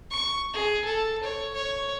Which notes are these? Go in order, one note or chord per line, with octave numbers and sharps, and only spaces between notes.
C#6
G#4
A4
C#5
C#5